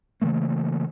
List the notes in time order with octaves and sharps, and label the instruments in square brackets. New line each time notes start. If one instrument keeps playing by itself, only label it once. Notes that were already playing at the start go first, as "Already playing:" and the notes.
[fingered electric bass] C#3 E3 A3 A#3